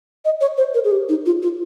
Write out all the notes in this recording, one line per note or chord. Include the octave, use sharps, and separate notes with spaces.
D#5
C#5
C5
A#4
G#4
G4
D#4
F4
F4